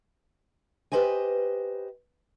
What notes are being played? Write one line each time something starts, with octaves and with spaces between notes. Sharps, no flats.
G4 A4 B4 C5 D#5 G#5